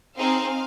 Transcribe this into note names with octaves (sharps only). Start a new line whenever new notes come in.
C4 D#4 G#4 F5